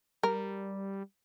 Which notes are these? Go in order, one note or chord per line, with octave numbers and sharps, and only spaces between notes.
G3 A#4